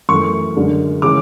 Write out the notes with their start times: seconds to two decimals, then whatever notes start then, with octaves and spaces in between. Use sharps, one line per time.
0.09 F#2 E3 A3 C#6
0.56 F#2 D3 G#3 D4
1.02 C#3 E3 G#3 C#4 D6